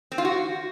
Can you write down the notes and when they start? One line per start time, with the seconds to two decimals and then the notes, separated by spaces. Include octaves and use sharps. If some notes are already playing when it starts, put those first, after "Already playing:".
0.12 C4
0.18 F4
0.25 F#4